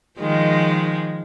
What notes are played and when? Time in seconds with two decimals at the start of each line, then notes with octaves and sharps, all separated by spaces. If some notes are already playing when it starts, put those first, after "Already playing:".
0.20 D#3 F3 G#3